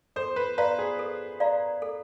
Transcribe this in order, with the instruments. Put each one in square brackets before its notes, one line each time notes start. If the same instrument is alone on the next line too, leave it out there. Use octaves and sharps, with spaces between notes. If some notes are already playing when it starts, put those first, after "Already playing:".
[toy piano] A4 [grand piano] C5
[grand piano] B4
[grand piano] B4 [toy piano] D5 F5 A#5
[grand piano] G#4
[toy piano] A4
D5 F5 A#5
A4